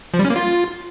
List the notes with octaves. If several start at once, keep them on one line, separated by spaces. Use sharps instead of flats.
F3
G3
C#4
A#3
F4